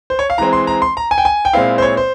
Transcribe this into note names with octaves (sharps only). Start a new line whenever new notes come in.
C5
C#5
F5
E3 G#3 C4 A#5
C6
A#5
C6
A#5
G#5
G5
G#5
G5
A#2 G#3 C4 E4 F5
C5
C#5
C5